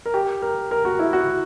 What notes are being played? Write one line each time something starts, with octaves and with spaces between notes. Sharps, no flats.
A#4
G4
A#4
A#4
F#4
E4
F#4